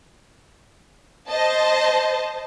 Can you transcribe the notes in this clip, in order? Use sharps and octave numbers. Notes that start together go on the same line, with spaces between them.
C5 D#5 A5